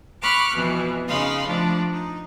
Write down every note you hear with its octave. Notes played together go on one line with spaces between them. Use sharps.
B5 C#6 D6 F6 F#6
F2 B2 E3
C#3 D#4 F5 B5 C6
F3 A3 D4
D#4